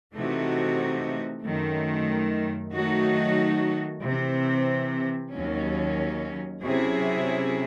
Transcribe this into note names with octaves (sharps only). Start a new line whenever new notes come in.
C3 E3 A3 D#4 F#4
F#2 D#3 A3
D#3 F#3 A3 D#4 F#4
C3 E3 C4
D#2 D#3 F#3 C#4
C3 F#3 C#4 E4 G#4